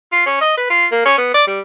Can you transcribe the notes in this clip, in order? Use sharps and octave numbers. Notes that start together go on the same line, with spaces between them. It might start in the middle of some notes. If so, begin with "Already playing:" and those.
F4
C#4
D#5
B4
F4
A#3
C#4
B3
D5
G3